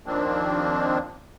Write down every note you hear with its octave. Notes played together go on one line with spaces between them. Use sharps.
D#2 D#3 F3 A#3 C4 D4